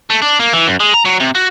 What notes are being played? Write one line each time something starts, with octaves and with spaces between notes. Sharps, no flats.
A3
D4
A#3
E3
F#2
G#3
A#5
F#3
C3
F#4